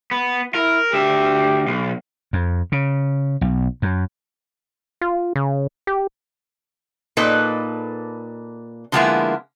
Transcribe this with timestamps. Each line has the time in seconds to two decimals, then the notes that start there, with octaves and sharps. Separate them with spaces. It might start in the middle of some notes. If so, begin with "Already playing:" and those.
0.11 B3
0.55 E4 A#4
0.93 D2 G4 E5
1.67 B1
2.33 F2
2.72 C#3
3.41 B1
3.82 F#2
5.01 F4
5.36 C#3
5.87 G4
7.17 A#2 A#3 D#4 A4 B4
8.92 D3 F3 G#3 A#3 B3 E4